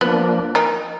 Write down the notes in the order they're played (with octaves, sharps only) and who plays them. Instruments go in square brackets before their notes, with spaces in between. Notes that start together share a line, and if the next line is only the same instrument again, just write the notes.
[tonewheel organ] F3 A#3 D4 [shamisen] B3
[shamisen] D#3 D#4